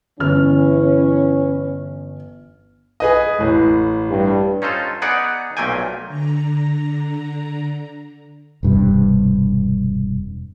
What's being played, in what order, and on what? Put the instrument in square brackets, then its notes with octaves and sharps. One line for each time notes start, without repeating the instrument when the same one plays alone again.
[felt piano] G1 F6 [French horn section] E3 C#4
[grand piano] G#4 B4 D#5
A1 A2
[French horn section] G2
[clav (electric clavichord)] C#4 D#4 F4 A4 C5
B3 D#4 G#4 D5 F#5
B1 A#2 A3 A#3 G5 G#5
[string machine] D3 A#5
[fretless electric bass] E1 G2 C3